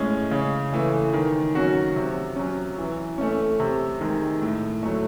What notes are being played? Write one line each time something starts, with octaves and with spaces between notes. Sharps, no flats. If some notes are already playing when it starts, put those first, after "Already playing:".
Already playing: A2 G#3 C#4
C#3
E3 A3
D#3
F#3 C#4 F#4
C3
F#3 C#4
E3
A3 C#4
C3
D#3 G#3
A2
F#3 A3